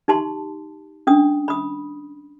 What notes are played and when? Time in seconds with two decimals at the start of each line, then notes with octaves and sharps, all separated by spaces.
0.08 D#4 G4 A5 C6
1.07 C#4 D4 D#6
1.48 B5 D#6